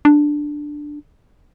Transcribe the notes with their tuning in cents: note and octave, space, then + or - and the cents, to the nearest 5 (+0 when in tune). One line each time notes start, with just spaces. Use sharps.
D4 +5